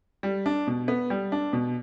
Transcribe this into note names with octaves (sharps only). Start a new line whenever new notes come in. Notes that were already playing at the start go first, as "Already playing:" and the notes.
G3
D4
B2
B3
G3
D4
B2